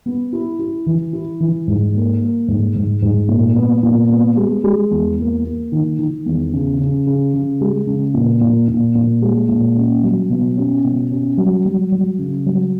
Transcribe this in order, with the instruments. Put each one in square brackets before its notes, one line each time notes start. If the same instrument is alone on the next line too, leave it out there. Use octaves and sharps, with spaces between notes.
[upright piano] B3
E4
E4
E3
E4
E3
G#2
A#3
A#3
G#2
G#2
G#2
A#2
B3
A#2
B3
G#3
G#3
E2
A#3
A#3
D#3
D#3
E2
C#3
C#3
C#3
C#3
G#3
C#3
A#2
A#2
A#2
A#2
G#3
A#2
C#4
F#3
B2
C#4
B2
C#4
F#3
F#3
F#3
C#3
F#3